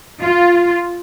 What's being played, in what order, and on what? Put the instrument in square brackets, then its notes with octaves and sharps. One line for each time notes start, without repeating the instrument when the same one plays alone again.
[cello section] F4